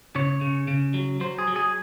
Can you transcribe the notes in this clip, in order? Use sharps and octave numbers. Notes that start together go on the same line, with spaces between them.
C#3 C#5
C#3
C#3
F#3
F#3 C5
G#4
F#3
G#4